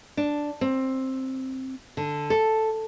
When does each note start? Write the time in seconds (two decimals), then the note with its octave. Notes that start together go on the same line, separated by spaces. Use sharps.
0.17 D4
0.61 C4
1.97 D3
2.30 A4